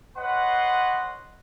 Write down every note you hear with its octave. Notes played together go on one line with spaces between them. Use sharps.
B4 C#5 D#5 F#5 C6